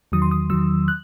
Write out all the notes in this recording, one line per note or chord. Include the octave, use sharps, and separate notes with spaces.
E2 D#3 F#3 D#6
C6
D#6
E2 D#3 F#3 E6
F#6